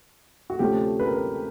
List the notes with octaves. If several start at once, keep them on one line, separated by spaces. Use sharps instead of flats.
F#4
D2 C3 F3 A3 C#4 G4
B4
A#4
B4